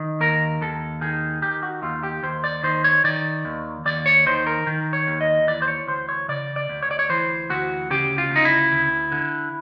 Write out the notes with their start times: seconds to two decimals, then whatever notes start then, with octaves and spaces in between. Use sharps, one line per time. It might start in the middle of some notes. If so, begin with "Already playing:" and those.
Already playing: D#3
0.20 D#2 A#4
0.61 D#2 A4
1.01 D#3 G#4
1.42 D#3 G4
1.63 F#4
1.82 D#2 F4
2.03 G4
2.23 D#2 C5
2.44 D5
2.63 D#3 C5
2.84 C#5
3.04 D#3 D5
3.45 D#2
3.85 D#2 D5
4.06 C#5
4.26 D#3 C5
4.47 A#4
4.67 D#3
4.93 C#5
5.07 D#2
5.21 D#5
5.47 E3 D5
5.62 C5
5.68 C#5
5.87 D2 C5
6.09 C#5
6.28 C#3 D5
6.56 D5
6.69 D2
6.83 C#5
6.91 D5
6.99 C#5
7.09 E3 C5
7.50 D2 F#4
7.90 C#3 G4
8.18 F4
8.31 D2
8.36 D#4
8.45 E4
8.72 D2
9.12 D3